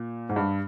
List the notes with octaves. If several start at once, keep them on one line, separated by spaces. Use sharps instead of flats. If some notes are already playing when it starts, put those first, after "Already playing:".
Already playing: A#2
G#2
G2